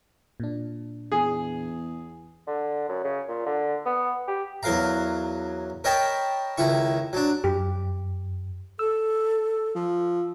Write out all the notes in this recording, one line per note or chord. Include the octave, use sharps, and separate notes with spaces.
A#2 D4
E2 G#4
D3
F#2
C#3
A#2
D3
B3
G4
E2 F#3 A#4 F5 A#5
A#4 C#5 D#5 G5 A5 B5
C#2 D#3 E4 C#6
F#3 D4
F#2 G4
A4 E6
F3